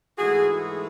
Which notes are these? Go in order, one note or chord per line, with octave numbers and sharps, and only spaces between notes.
G#2 E3 A3 F#4 G#4